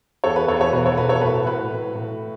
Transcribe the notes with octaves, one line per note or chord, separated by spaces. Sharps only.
E2 A4 C#5
F#4 B4
E2 A4 C#5
A4 C#5
B2 F#4 B4
A4 C#5
B2 F#4 B4
A4 C#5
A2 F#4 B4
A2 F#4 B4
A2
A2